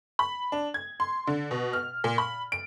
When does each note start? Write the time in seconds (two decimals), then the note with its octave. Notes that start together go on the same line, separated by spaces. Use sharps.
0.19 B5
0.52 D4
0.74 G#6
1.00 C6
1.27 D3
1.51 B2
1.73 F6
2.04 A#2
2.18 B5
2.52 D7